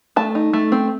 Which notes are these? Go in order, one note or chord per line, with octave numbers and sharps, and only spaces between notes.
A3 A5
D#4
A3
C4